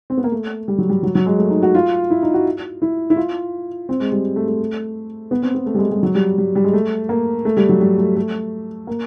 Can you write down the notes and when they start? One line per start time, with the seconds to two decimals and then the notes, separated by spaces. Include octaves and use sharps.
0.10 C4
0.17 B3
0.24 A#3
0.32 A3
0.68 G3
0.78 F#3
0.89 G3
1.03 F#3
1.15 F#3
1.26 G#3
1.39 A3
1.50 D#4
1.63 F#4
1.75 F4
2.10 E4
2.22 D#4
2.34 F#4
2.82 E4
3.10 E4
3.16 F4
3.89 C4
4.00 G#3
4.12 G3
4.36 A3
4.48 A3
5.31 B3
5.43 C4
5.55 B3
5.66 A3
5.74 G3
5.79 G#3
5.91 G3
6.03 F#3
6.15 G3
6.38 G3
6.55 G3
6.64 G#3
6.73 A3
7.09 A#3
7.45 A3
7.57 G3
7.69 F#3
7.81 G3
7.98 A3
8.16 A3
8.87 A#3